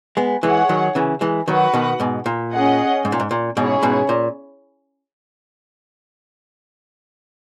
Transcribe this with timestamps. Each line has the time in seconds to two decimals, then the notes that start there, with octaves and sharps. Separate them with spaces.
0.17 G#3 B3
0.43 E3 G#3 G#4 C#5 F#5
0.69 D#3 F#3
0.95 C#3 E3
1.21 E3 G#3
1.47 D#3 F#3 F#4 B4 F#5
1.74 B2 D#3
2.00 G#2 B2
2.26 A#2
2.52 C#4 G#4 D#5 F#5
3.05 G#2
3.12 A#2
3.20 G#2
3.31 A#2
3.56 G#2 B2 C#4 E4 G#4 C#5
3.83 G#2 B2
4.09 A#2